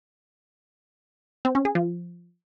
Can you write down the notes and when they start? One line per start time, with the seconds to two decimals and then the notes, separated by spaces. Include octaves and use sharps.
1.45 C4
1.55 C#4
1.65 G#4
1.75 F3